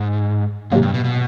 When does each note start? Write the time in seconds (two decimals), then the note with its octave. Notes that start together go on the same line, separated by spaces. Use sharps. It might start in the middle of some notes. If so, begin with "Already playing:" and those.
Already playing: G#2
0.72 G#2 C3 D#3 F#3 A#3
0.83 G2
0.94 B2
1.04 B2